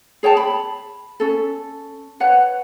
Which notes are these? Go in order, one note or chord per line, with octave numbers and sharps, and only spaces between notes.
G#4 C#5 G5 A5
B5
C#4 A4
B4 C#5 F#5